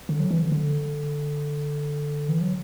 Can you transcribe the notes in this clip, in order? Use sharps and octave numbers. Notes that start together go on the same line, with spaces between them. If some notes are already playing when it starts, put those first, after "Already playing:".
D3
F#3
E3
D3
D3
E3
F#3